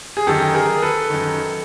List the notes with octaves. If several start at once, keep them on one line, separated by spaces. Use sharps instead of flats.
G#4
F#2 D#3 G4 A4
G#4 A#4
A4 B4
F#2 D#3